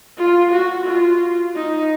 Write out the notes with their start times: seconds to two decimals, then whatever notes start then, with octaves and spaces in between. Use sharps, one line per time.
0.18 F4
0.52 F#4
0.86 F4
1.55 D#4